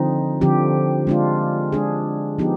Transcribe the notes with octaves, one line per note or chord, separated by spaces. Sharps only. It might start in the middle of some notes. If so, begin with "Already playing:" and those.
Already playing: D3 F3 C4 D#4
D3 F3 C4 G4
G#3 D4 F4
G#3 D4 G#4
F3 B3 D#4 G4